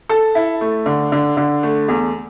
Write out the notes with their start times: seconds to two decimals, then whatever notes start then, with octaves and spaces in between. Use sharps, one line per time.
0.09 A4
0.35 E4
0.61 A3
0.86 D3
1.12 D3
1.37 D3
1.63 A3
1.88 E2